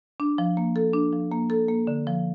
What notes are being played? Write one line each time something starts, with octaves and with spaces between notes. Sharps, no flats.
D4
F3
A#3
A4
D4
F3
A#3
A4
A#3
D3
F3